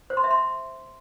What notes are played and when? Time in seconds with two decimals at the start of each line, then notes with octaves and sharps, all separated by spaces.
0.10 C5
0.17 C6
0.24 E5
0.31 C6